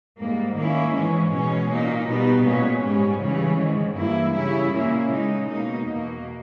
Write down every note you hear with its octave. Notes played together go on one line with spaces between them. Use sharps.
G#2 G3 A#3
D#3 A#3 C#4 E4
G#2 E3 G#3 C#4
B2 G#3 C#4
A#2 A#3 D#4
B2 G3 B3 D#4
A#2 G#3 C#4
G#2 G3 C#4
C#3 E3 G3 C#4
G#2 D#3 G#3
G2 E3 A#3 E4
C#3 G3 C#4 E4
A#2 A#3 C#4 E4
C#3 G#3 D#4
B2 A#3 D#4
E2 B2 A#3